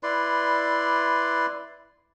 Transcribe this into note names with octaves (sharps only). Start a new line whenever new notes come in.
E4 B4 D5 C6